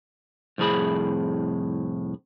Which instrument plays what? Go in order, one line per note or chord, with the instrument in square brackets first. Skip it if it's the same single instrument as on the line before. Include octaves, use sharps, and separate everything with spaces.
[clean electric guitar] C2 F2 A2 G#4 B5